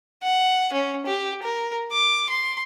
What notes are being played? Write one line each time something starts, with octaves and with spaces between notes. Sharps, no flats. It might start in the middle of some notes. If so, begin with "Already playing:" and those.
F#5
C#4
G4
A#4
D6
C6